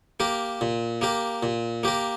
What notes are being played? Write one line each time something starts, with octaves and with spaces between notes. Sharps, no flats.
A#3 G4 A#4
A#2
A#3 G4 A#4
A#2
A#3 G4 A#4